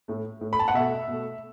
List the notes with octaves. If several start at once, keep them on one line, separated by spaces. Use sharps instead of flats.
A2 A3
A2 A3
B5
A5
F#5
B2 A3 E5
B2
A3